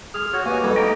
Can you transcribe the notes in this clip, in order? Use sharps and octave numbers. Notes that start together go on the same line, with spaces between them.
G#4 G#5 C6 F6
F#4 C#5
E3 A#3 D#4 F#4 G4 G#5
F2 E3 G3 G#3 A4
A#3 D#4 D#5 G5